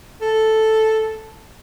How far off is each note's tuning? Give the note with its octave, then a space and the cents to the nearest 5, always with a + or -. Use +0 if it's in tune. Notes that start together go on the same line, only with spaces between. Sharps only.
A4 +0